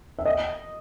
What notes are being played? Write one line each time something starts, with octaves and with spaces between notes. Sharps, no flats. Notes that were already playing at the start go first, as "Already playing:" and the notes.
E5
D#5